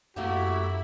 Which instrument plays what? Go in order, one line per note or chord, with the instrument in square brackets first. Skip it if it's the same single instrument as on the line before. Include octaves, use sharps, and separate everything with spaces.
[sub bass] F#2 [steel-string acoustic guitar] A3 A#3 G4 [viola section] E4 B5 [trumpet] F#4